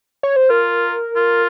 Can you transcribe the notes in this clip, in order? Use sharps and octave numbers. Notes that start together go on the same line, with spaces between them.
C#5
C5
F4 A#4
F4